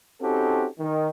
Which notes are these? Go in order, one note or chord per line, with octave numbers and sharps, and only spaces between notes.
C4 C#4 D#4 F#4 G4 A4
D#3